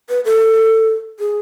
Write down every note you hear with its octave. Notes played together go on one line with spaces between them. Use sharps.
B4
A4
G#4